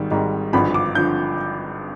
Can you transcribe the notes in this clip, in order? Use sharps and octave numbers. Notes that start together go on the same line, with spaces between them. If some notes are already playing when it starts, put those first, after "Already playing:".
Already playing: G#1 G#2 D#3 G3
G#1 G#2 D#3 G3
G#1 G2 D3 F3 B5
D6
D3 F3 G6